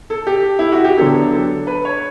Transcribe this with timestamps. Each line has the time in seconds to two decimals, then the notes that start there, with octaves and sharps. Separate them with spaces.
0.10 A4
0.27 G4
0.59 E4
0.72 F#4
0.84 G4
0.97 D3 F#3 B3 D4 A4
1.32 A4
1.67 B4
1.85 C#5